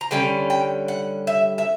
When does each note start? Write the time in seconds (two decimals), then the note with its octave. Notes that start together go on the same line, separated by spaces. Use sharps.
0.01 A#5
0.11 D3 G3 C#4 G5
0.50 G5
0.88 F#5
1.27 E5
1.58 E5